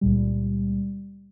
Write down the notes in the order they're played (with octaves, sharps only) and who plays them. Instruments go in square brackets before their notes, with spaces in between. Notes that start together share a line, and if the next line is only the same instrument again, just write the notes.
[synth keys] C#2 A#2 G3